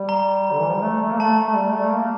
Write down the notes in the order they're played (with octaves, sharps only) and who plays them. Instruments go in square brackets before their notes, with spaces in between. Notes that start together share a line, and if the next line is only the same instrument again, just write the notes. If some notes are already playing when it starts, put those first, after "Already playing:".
Already playing: [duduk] G3
[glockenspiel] A#5
[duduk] D3
E3
F3
G3
A3
A3
A#3
[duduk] A3 [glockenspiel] A5
[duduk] A3
G3
A3
A#3